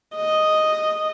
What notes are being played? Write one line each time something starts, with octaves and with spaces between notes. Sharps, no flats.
D#5